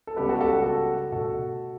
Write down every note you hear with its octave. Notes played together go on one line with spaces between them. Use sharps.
A4
C#2 C#3 G3 B3 G4 B4
F#4 A4
G4
F#4 A4
F#4
F#4 A4
B2 A3 F#4 A4